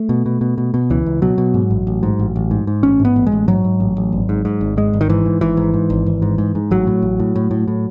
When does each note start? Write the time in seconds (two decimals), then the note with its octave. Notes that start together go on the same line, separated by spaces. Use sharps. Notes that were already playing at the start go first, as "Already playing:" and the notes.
Already playing: A3
0.09 B2
0.26 B2
0.41 B2
0.58 B2
0.74 B2
0.90 C#2 E3
1.06 C#2
1.22 B2 F#3
1.38 B2
1.54 G#2
1.71 A1
1.87 A1
2.03 G#2
2.19 A1
2.36 A1
2.51 G#2
2.67 G#2
2.83 A1 C#4
3.00 G#2
3.05 B3
3.16 A1
3.27 G#3
3.32 A1
3.48 G#2 F#3
3.64 G#2
3.80 A1
3.97 A1
4.12 G#1
4.29 G#2
4.45 G#2
4.61 G#1
4.77 G#2 G#3
4.94 G#1
5.01 D#3
5.09 G#2 E3
5.25 G#2
5.41 G#1 E3
5.57 G#2
5.74 G#2
5.90 G#1
6.06 G#1
6.22 G#2
6.38 G#2
6.55 G#2
6.71 A1 F#3
6.87 A2
7.02 A1
7.20 A2
7.36 A2
7.51 A2
7.68 A2